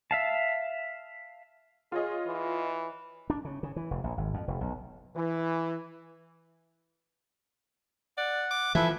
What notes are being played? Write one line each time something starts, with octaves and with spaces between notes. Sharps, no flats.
E5 F5 A5
F4 G#4 C#5 D#5
E3
D4
C#3
C#3
E3
F1
A#1
G#1
F2
F1
B1
E3
D5 F#5
D6
E3 F3 A4 B4 E5 G#5